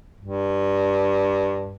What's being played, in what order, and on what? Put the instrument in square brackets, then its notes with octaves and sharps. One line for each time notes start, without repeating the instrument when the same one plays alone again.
[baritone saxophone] G2